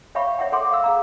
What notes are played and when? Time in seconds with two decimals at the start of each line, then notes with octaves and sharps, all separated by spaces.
0.15 C#5 E5 F5 G5 B5 C#6
0.39 C#5 E5 F#5 G5
0.52 A4 C#5 F#5 C6 D6
0.71 F5 E6
0.84 G#4 F5 A#5